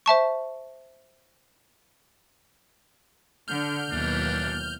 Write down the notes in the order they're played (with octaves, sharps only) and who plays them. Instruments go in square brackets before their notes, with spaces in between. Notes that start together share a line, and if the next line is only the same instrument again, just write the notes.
[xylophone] C5 E5 A5 C#6
[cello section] D3 [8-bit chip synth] F6 G6
[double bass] D#2 F#3 [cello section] B2 E3 [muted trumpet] D4